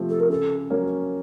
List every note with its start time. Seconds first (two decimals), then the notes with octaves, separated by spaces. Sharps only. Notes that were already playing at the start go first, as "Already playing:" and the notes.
Already playing: C3 F3 A3
0.10 A4
0.20 A#4
0.30 C#3 A4
0.70 F#3 A#3 C#4